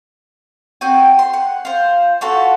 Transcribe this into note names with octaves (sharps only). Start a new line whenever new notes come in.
C4 F#4 G#5
C6
F#5
F4 C5
F4 F#4 A4 B4